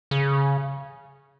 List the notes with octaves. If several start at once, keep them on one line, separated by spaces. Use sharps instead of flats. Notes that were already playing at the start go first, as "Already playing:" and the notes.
C#3